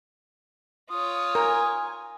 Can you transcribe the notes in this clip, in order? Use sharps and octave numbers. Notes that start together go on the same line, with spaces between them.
F4 C#5 D#6
A#4 G#5